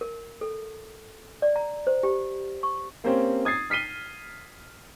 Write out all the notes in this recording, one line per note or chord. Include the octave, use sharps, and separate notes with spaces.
A#4
A4
D5
A#5
C5
G4
C#6
A#3 C4 C#4 G4 C5 C#5
D#6 G#6 A6 C7
F6 B6 C7 D#7 G7